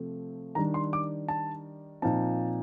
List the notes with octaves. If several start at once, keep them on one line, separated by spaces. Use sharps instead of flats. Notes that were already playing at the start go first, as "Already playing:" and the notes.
Already playing: C3 F3 A3 C4
D#3 G3 D4 A#5
C6
D6
A5
A#2 F3 C4 D#4 A5